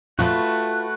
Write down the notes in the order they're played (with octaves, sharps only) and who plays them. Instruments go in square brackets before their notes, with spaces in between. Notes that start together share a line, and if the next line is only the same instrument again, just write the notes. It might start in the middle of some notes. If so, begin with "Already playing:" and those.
[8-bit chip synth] F2 A#2 F3 [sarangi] A3 [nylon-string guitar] F4 [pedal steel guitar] F#4 B4